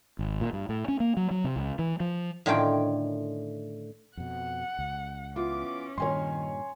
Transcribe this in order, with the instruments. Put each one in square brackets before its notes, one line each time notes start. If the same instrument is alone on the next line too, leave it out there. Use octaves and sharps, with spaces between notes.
[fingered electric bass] G#1
A#2
G2
A2
C#4
A#3
F#3
F#3
C3
C#2
E3
F3
[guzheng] A2 D3 D#3 C#4 F4 G5
[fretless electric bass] F2 B2 [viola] F#5
[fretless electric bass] C#2
[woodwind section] E3 B3 D6 [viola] C#4 [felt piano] F4
[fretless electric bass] G2 A#2 [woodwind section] D#3 [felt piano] C#5 G#5 C6